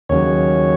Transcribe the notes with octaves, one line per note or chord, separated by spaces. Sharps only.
D#2 C#3 F#3 C#5